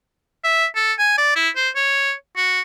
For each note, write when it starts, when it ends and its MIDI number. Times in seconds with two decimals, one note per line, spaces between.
0.44 0.65 76
0.75 0.93 69
0.99 1.15 80
1.18 1.33 74
1.36 1.49 64
1.56 1.69 72
1.75 2.13 73
2.36 2.60 66